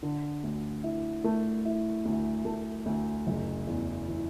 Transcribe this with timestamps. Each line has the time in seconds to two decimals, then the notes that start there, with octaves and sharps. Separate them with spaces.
0.03 D3
0.44 D2
0.83 E4
1.24 A3
1.65 E4
2.06 D2
2.45 A3
2.86 D2
3.27 F#1
3.67 E2
4.08 E3